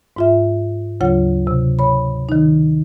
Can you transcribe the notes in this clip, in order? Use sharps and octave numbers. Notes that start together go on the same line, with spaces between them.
G#2 F4 E5
D2 C#3 F#3 F4 C#5 F#5
C3
C#5 B5
D#3 D#4